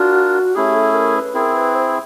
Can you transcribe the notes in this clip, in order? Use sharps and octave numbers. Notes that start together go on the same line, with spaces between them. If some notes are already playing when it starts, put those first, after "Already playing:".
Already playing: D4 F4 F#4 A#4
A3 C#4 E4 G4 G#4
A4
A#4
B4
C4 E4 G#4 A#4
B4
C5